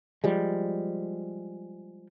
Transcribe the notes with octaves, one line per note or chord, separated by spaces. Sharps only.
F3 G3 G#3